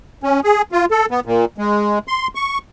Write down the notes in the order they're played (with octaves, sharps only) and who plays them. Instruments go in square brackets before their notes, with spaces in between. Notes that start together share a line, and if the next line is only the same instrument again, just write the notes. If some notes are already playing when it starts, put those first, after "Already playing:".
[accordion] C#4
G#4
F4
A4
B3
A#2
G#3
C6
C#6